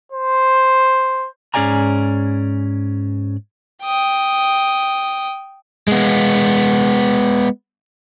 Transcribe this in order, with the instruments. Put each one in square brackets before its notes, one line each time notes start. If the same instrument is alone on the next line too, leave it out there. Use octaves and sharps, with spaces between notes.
[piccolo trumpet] C5
[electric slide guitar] G#2 C#4 G#4 D5 G#5 A#5
[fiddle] G5 D#6
[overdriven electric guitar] G#3 B3